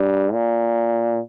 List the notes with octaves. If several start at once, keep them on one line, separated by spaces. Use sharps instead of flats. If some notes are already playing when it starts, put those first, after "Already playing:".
Already playing: G2
A#2